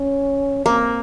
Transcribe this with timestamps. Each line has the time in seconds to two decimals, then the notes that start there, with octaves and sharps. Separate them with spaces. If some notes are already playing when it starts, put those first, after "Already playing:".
Already playing: C#4
0.66 A#3 C4